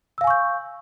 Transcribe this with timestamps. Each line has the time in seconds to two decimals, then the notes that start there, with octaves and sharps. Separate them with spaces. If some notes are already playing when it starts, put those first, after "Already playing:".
0.18 E6
0.21 F5
0.24 G#5
0.27 C#6
0.30 G6